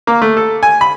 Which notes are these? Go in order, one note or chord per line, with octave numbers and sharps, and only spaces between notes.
A#3
A3
A4
G#5
B5